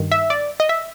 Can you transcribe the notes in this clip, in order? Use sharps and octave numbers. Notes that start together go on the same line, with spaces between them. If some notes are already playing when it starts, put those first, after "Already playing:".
Already playing: G2 D#3
E5
D5
D#5
E5